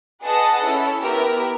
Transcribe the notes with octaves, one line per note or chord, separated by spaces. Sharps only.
G#4 B4 D#5 F#5 A5
C#4 E4 A4
B3 E4 G4 A#4